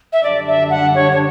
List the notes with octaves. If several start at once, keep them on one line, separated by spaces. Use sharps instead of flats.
E5
F#2 D3 G3 D4 D5
E5
F#5
C#5
C#5